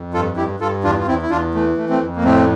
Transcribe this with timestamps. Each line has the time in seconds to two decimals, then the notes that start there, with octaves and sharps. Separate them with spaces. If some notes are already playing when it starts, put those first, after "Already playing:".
Already playing: F2
0.14 G2 F4 A4
0.36 G2 E4 G4
0.60 G2 F4 A4
0.84 E2 D4 F4
0.99 F4
1.07 E2 C4 E4
1.22 E4
1.30 E2 D4 F4
1.54 E3 A3
1.77 A3
1.89 A3 C4
2.01 F2
2.16 A#3
2.24 A2 A3 C4